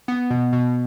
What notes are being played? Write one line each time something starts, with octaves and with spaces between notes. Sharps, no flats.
B3
B2
B2